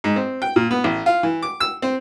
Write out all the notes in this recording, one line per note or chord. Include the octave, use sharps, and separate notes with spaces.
G#2
C4
G5
A#2
B3
A1
F4
E3
D6
E6
C4